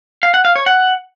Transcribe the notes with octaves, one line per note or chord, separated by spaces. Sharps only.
F5
F#5
F5
C#5
F#5